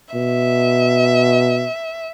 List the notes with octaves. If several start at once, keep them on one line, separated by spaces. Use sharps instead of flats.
B2 E5